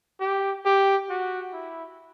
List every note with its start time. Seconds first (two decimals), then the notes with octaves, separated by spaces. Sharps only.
0.21 G4
0.66 G4
1.09 F#4
1.53 E4